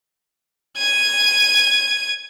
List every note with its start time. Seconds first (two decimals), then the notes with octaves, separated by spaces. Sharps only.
0.78 G#6 D#7